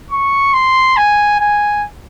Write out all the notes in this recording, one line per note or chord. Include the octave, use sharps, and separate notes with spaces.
C#6
C6
G#5
G#5